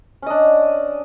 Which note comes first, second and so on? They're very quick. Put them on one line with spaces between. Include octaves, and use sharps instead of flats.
C#4 D#5 D4